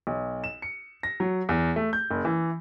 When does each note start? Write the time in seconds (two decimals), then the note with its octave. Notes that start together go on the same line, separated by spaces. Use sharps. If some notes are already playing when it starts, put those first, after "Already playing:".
0.07 B1
0.44 E7
0.62 C#7
1.03 A#6
1.20 F#3
1.49 E2
1.76 A3
1.93 G6
2.11 F#1
2.25 E3